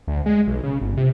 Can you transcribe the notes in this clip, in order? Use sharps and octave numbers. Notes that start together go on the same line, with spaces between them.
D2
G#3
B1
C#3
G1
C3